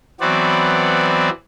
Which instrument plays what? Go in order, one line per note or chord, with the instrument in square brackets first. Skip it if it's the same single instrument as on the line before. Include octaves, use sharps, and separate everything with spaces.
[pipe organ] E3 F#3 B3 C4 F#4 D5